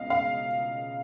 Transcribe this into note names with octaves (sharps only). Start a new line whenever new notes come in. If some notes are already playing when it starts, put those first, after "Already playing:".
Already playing: C#2 B2 D#5 F5
F5